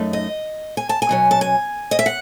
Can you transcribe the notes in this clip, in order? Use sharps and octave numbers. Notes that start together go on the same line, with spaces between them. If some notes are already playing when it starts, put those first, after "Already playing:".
Already playing: F#2 A3 D#4
D#5
G#5
A5
G#5
B2 F#3 C#4
A5
G#5
D#5
E5
F#5